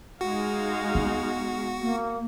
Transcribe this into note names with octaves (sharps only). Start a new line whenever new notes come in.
G#3 D#4 F#4 F5
B3
A#3